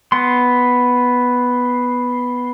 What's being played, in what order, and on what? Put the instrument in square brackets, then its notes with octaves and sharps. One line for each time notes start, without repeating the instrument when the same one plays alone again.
[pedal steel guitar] B3 C6